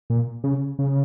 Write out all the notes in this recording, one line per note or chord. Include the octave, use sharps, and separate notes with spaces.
A#2
C#3
C#3